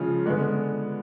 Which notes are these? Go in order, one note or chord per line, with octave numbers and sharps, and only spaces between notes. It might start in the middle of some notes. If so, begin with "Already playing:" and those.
Already playing: C#3 F3 G#3 C#4 F4
D3 G#3 B3